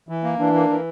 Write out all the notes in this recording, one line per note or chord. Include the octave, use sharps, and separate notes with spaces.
E3
A#3
E3 D4
A#3
E3